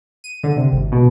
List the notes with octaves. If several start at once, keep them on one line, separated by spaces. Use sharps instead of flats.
D#7
D3
C3
G#1
B2